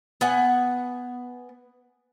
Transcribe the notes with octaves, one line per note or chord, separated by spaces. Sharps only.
B3 F#5 G#5